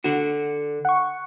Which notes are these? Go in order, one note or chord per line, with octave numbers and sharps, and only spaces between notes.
D3 F#4
F#5 C#6